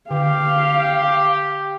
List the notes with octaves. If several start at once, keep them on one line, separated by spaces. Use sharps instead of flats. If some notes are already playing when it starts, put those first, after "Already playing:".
D3 G4 F5